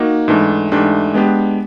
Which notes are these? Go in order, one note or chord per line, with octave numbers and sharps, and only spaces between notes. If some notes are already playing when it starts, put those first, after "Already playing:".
Already playing: A#3 D#4 F#4
G#2 E3 A3 D4
G#2 E3 A3 D4 G4
G#3 B3 D4 G4